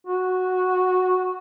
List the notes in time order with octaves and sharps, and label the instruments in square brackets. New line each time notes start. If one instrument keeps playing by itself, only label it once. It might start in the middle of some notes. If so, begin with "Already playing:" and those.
[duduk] F#4